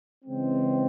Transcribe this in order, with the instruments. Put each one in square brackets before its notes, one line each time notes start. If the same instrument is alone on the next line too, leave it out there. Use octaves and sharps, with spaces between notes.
[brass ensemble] C#3 E3 G#3 C4